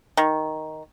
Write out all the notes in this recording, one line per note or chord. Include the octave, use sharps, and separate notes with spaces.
D#3